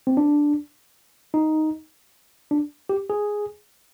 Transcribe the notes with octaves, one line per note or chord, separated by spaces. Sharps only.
C4
D4
D#4
D4
G4
G#4